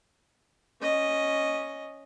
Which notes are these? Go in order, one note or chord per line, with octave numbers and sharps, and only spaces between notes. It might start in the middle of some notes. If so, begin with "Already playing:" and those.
C#4 D#5